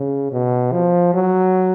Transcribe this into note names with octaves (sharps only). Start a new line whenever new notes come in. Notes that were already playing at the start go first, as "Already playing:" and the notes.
Already playing: C#3
B2
F3
F#3